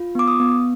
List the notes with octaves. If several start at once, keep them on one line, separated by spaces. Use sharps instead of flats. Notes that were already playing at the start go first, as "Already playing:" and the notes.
Already playing: F4
B3 D6
D#6
B3